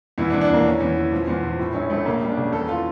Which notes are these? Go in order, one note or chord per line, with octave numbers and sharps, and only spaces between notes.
E2 E4
D4
E2
D4
E2 A#3
E3 C#4
E2
E3
F3
E2
F3
A2
A#1 C#4
A#1 A3
C#3 A#3
G3
D4
C#3
E2 A4
E3 F4